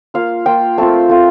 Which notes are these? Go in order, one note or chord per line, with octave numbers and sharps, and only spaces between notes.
A#3 F4 F5
A#3 F4 G5
A3 C4 F4 A5
A3 C4 F4